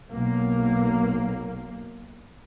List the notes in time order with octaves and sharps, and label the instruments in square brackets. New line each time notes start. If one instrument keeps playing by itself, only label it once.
[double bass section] B1 A#3